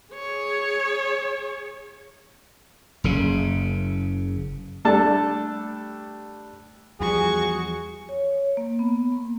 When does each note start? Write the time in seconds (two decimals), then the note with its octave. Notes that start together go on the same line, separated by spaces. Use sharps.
0.14 G#4 C#5
3.04 F#1 C#3
4.85 G3 A3 D4 A4 A5
7.00 E2 F3 G3 F#4 G#4 C#6
8.09 C#5
8.57 A#3
8.79 B3
9.12 A#3